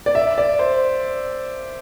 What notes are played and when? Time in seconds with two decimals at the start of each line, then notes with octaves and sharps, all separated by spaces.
0.06 D5
0.15 E5
0.38 D5
0.59 C5